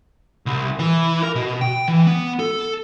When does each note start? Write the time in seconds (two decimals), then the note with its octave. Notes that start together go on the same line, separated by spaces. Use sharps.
0.46 C2
0.79 E3
1.23 A#4
1.35 B2
1.61 G5
1.88 E3
2.07 B3
2.39 A4